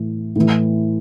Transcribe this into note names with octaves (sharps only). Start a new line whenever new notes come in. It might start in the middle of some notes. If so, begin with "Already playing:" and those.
Already playing: A2 E3
A2 E3